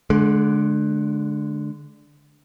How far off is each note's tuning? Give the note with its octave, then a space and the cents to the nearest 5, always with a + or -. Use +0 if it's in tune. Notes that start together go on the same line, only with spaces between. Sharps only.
D3 +0 G#3 +35